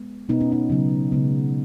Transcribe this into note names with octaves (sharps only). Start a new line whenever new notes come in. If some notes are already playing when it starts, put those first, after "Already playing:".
Already playing: G#3 B3
B2 B3 D#4
C#4
D#4
C#3 F#3 B3
C#3 G#3 B3